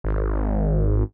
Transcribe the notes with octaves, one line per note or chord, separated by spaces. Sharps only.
G#1